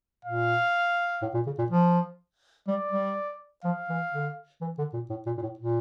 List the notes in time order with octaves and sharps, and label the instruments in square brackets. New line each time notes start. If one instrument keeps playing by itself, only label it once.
[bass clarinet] A#2 [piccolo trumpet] F5
[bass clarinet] A2
A#2
C#3
A#2
F3
[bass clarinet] G3 [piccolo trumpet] D5
[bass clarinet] G3
[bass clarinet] F3 [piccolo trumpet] F5
[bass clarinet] E3
D3
E3
D3
A#2
A2
A#2
A#2
A2
A#2